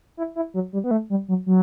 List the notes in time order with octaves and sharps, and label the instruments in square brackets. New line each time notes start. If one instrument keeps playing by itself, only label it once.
[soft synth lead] E4
E4
F#3
G3
B3
A3
G3
F#3
F#3